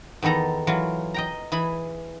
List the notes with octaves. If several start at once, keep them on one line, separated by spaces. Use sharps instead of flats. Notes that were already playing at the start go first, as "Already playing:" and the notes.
E2 D#3 B3 A4 A#5
E3 F#3 F4
D#5 G5 A#5
E3 G#4 B5